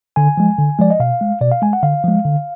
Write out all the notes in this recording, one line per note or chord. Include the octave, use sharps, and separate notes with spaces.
D3 G#5
F3 G#3
D3
F3 G#3 D5
D#5
B2 F5
G#3
B2 D5
F5
G#3 G#5
F#5
D3 F5
F3 G#3
D3